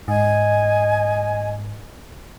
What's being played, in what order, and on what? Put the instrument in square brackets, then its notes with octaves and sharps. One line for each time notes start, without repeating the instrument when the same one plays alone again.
[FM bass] G#2 [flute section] D#5 G#5